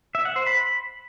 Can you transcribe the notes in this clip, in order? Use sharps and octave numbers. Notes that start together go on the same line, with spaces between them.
E5
F#5
C5
B5